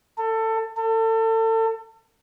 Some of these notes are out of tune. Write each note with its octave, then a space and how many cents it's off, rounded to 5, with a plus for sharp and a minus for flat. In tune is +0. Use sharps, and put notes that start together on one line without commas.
A4 +20
A4 +30